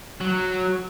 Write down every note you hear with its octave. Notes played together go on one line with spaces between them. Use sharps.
F#3